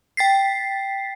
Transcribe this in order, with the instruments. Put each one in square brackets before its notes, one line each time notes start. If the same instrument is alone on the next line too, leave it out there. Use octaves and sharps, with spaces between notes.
[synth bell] G5 A6 B6 C7